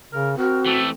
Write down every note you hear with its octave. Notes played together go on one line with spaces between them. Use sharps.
C#3 A#4
C4 F#4 A#4
E3 A3 A4